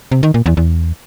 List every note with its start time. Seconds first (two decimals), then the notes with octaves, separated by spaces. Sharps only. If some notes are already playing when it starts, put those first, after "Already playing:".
0.12 C3
0.23 D#3
0.34 A#2
0.46 E2
0.57 E2